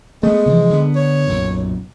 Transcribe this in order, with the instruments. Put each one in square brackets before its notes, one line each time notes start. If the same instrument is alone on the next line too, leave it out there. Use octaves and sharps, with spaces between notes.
[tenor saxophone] G#3 [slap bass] A3 B3
[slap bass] C3 E3 F3
D3 B3
[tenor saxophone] C#5
[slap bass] B1 F#2 A#2